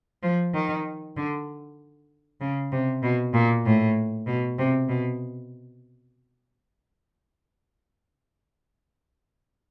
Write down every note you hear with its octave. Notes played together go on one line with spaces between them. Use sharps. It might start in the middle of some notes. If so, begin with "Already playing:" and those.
F3
D#3
D3
C#3
C3
B2
A#2
A2
B2
C3
B2